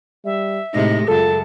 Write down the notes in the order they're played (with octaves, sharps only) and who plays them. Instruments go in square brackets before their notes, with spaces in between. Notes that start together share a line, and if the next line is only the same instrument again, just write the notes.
[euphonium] G3 [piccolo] E5
[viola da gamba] A2 C3 G#3 [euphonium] D#4 [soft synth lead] A#6
[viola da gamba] F#2 C#3 [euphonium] F4 [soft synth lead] A4 [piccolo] A5